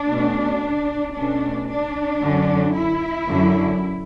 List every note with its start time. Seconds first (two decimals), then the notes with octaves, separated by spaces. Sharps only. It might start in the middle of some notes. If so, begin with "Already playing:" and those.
Already playing: D4
0.09 B2 A3 C#4
1.14 B2 A3 C#4 D4
1.67 D4
2.21 F#2 D3 F#3 C#4
2.74 E4
3.27 F#2 D3 F#3